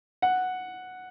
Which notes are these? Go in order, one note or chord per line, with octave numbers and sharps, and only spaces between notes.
F#5